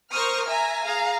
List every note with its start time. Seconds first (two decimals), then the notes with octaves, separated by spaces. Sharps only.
0.11 A#4 C5 C#6 D#6 F6
0.47 E5 G#5 A#5
0.85 G#4 F5 A#5